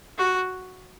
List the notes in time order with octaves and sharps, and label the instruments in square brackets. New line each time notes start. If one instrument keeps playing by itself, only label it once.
[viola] F#4